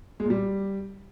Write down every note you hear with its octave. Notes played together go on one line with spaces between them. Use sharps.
G#3
A#2
G3